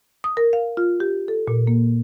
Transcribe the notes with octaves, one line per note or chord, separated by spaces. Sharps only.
D#6
A#4
F5
F4
G4
A4
A#2
A#3